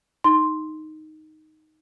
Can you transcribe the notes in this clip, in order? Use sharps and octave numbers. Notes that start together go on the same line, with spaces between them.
D#4 C6